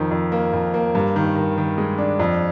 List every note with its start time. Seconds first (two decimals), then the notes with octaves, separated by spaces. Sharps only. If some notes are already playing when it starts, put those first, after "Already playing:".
Already playing: F2 D#3
0.11 F2
0.32 A#3
0.53 F2
0.74 A#3
0.95 G2
1.16 D#3
1.36 D#3
1.58 D#3
1.78 G#3
1.98 D4
2.20 F2